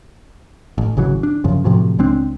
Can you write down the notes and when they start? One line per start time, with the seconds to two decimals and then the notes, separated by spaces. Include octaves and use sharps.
0.78 A1
0.97 G#1 C#3 E3 F#3
1.23 D4
1.44 F#2 C#3 F3
1.64 A2 C3 F3 F#3
1.99 C#2 G#3 C4 D4